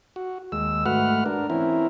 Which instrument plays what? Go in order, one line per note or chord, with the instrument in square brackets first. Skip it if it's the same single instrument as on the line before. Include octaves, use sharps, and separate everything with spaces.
[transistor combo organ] F#4
D#2 G#3 E6
G#2 A3 F#4 B4 F#5 F6
D4 A#4
E3 C4 C#4 E4 A#4